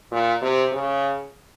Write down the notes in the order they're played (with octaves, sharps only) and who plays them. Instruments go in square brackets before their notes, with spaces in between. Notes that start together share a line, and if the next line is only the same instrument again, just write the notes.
[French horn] A#2
C3
C#3